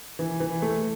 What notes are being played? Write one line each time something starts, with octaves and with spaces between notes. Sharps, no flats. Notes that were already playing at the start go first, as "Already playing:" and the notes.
E3
E3
A3